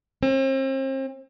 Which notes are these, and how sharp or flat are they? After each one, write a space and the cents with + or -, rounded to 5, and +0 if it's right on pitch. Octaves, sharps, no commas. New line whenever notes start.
C4 +40